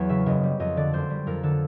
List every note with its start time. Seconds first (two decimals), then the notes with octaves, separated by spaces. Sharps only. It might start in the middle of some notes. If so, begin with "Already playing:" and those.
Already playing: E2 F#3 G#4 B4 C#5
0.09 C#3 E5
0.26 F#1 D#5
0.43 G3
0.60 F2 D#5
0.77 D3 D5
0.93 F#1 C5
1.10 G3
1.27 F2 A#4
1.43 D3 A4